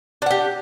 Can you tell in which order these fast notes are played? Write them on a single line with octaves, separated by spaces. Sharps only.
D4 F#5 G4